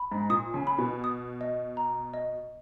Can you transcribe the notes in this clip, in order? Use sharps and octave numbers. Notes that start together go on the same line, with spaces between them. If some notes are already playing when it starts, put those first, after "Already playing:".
Already playing: B5
G#2
A#2 D#6
C#3
B5
B2
D#6
D#5
A#5
D#5